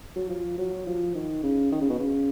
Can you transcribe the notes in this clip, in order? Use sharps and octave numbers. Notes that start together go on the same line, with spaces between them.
F#3
F3
F#3
F3
D#3
C#3
D#3
C#3
B2
C#3